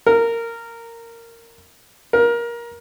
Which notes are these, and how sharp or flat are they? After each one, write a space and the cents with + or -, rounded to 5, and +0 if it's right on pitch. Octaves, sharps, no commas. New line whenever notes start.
A#4 -15
A#4 +20